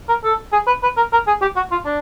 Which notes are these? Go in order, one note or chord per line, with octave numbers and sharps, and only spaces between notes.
A#4
A4
G#4
B4
B4
A#4
A#4
G#4
G4
F#4
F4
D4